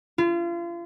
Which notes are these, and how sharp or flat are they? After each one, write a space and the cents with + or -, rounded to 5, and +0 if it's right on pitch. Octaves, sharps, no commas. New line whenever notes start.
F4 -35